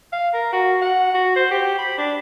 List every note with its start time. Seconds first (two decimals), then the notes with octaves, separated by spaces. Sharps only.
0.13 F5
0.34 A#4
0.53 F#4
0.82 F#5
1.14 F#4
1.36 C5
1.51 G4
1.79 B5
1.98 D4